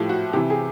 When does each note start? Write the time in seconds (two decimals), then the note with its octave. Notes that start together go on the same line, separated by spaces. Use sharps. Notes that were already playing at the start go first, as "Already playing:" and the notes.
Already playing: A2 F3 G4
0.09 F#4
0.33 C3 E3 G4
0.50 G#4